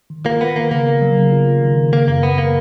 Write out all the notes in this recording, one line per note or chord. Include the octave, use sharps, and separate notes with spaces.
D#3
A#3 F4
B3 F4
D#3 A#3
C#3 A#3
B3
F#3
C#3
F4
F4
D#3
D#3
C#3 A#3
F#2 A#3
F#2 B3
A#3